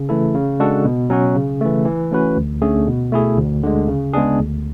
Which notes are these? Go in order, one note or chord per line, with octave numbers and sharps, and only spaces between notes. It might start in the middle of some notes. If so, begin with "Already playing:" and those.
Already playing: C#3
E3 A3 E4 A4
C#3
G#3 D4 F#4 A4
B2
F#3 C#4 F#4
C#3
E3 A3
E3
A3 C#4 F#4 B4
D2
D3 A3 C#4 G#4
B2
A3 E4 G#4
D2
D3 G#3
C#3
G#3 B3 D4 G#4
D2